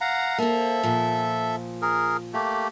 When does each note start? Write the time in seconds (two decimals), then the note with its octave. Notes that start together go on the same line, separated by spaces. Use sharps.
0.01 F5 F#5 A#5
0.38 A#3 C4 A4 E5
0.83 A#2 F3
1.82 G#4 A#4
2.33 A3 A#3 G4